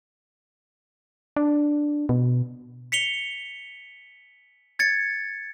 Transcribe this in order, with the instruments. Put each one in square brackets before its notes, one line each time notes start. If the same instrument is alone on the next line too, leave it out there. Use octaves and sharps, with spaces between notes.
[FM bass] D4
B2
[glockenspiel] B6 C#7 F7 G7
G#6 A6 C#7